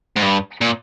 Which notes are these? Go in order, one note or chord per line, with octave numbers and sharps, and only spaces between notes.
G#2
G2
A#2